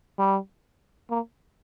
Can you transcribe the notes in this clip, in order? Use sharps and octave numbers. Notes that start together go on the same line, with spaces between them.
G3
A#3